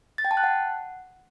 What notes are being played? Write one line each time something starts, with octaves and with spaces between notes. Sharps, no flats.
A6
G5
A5
F#6
F#5